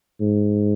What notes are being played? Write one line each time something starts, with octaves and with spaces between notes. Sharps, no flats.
G#2